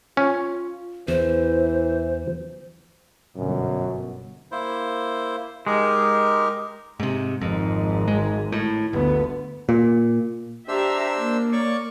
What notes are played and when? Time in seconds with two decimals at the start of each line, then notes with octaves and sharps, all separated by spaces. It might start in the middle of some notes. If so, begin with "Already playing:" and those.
0.17 C#4 F4
1.08 E2 E3 C5
3.37 G1 F#2 B2
4.52 A#3 E4 C5
5.67 G#3 D#4 G4 A#4
7.00 G#2 C3
7.41 G#1 F2 G#2
8.08 G#3
8.52 A2
8.93 G1 D2 B3
9.69 A#2
10.68 D4 G4 C5 E5 A#5 E6
11.18 A#3
11.52 C#5 D5 C#6